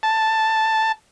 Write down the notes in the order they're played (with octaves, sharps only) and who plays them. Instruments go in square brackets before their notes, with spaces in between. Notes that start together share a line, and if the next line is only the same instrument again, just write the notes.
[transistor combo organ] A5